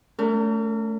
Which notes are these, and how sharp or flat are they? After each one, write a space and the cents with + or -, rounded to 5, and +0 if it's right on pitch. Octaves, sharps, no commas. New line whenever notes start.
A3 +0 C#4 +45 A#4 -35